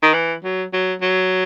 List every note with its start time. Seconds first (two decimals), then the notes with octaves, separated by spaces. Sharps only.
0.03 D#3
0.14 E3
0.44 F#3
0.73 F#3
1.02 F#3